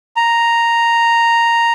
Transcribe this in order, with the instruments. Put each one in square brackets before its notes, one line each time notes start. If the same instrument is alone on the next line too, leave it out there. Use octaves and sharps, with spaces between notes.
[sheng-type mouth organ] A#5